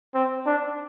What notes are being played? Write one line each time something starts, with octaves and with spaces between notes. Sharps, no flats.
C4
D4